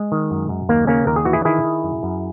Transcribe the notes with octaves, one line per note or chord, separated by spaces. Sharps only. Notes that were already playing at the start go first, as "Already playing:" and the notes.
Already playing: G#3
D#3
F#2
F#2
D#2 A#3
C#3 A#3 C#4
D#2 A#4
G#4
E3 F#4
E4 G#4
D#3 E4 G#4
D#3
F#2
F#2